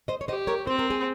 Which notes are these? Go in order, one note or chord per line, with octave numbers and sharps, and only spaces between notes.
C5 D#5
C#5
G4 C5 D#5
A#4 C#5
C4 C5
A#4
G#4 C5